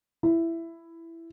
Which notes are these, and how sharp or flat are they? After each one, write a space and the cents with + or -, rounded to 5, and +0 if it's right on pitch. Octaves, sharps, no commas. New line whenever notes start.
E4 +10